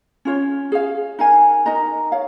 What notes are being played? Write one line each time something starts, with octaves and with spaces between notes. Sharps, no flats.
C#4 F4 C#5
G#4 C#5 F5
D#4 A#4 F5 G#5
D#4 A#4 D#5 A#5
C#5 F5